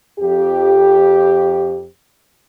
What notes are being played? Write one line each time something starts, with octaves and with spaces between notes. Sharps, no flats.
F2 G4